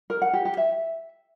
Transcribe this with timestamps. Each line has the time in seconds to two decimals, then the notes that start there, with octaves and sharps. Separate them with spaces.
0.10 A#4
0.22 F#5
0.33 G4
0.45 G4
0.57 E5